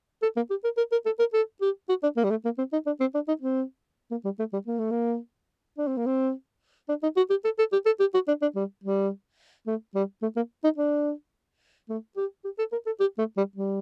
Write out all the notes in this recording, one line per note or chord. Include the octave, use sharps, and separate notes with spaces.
A4
A#3
G4
A#4
A#4
A#4
A4
A#4
A4
G4
F#4
D4
A#3
G3
A3
A#3
C4
D#4
D4
C4
D4
D#4
C4
A#3
G3
A3
G3
A#3
A3
A#3
D4
C4
A#3
C4
D4
D#4
F#4
G4
A4
A4
G4
A4
G4
F#4
D4
D4
G3
G3
A3
G3
A3
A#3
D#4
D4
A3
G4
G4
A4
A#4
A4
G4
A3
G3
G3